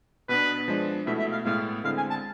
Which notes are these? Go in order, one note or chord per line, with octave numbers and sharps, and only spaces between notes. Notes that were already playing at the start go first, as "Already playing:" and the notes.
B2 B3 D4 B4
F3 G#3 D4
B2 A3 E4 E5
E5
F5
A2 G#3 B3 E4 F5
D3 G#3 C4 E4 F5
G#5
A5